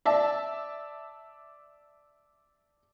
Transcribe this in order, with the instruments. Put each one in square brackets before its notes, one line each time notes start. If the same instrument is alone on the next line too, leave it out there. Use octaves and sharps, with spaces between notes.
[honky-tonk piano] D5 E5 A5